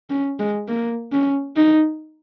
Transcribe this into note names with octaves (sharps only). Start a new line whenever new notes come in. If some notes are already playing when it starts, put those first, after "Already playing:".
C#4
G#3
A#3
C#4
D#4